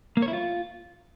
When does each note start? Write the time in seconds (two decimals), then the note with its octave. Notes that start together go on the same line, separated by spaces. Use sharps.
0.17 A#3
0.22 C#5
0.28 E4
0.33 F4